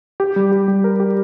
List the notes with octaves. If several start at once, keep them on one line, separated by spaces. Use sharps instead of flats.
G4
G3
G4
G3
A#4
G4